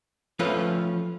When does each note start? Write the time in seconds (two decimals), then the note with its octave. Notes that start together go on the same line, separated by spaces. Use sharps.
0.39 F3 A3 C#4 F4 B4